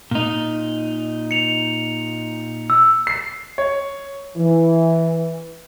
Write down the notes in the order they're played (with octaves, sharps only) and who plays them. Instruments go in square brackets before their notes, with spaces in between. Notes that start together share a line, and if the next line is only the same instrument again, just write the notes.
[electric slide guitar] A#2 D#4
[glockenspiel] C#7 F7
E6
[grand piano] C7
C#5
[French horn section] E3